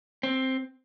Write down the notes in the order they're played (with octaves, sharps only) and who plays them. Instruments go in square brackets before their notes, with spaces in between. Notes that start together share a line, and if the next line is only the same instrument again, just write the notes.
[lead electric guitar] C4